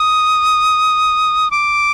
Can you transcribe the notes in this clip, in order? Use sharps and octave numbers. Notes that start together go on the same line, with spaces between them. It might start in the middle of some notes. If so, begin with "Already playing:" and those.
Already playing: D#6
D6